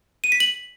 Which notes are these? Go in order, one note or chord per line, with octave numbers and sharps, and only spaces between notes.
D#7
B6
F#7